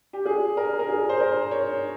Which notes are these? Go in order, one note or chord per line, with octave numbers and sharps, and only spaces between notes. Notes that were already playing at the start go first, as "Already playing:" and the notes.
G4
G#4
A#4
A#4
G#4
C5
A#4
C#5